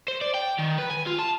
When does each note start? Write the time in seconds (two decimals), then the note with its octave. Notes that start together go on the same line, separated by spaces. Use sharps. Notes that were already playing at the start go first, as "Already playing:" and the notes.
0.08 C5
0.21 D5
0.34 G5
0.58 D#3
0.78 B4
0.90 G#5
1.06 F4
1.18 A5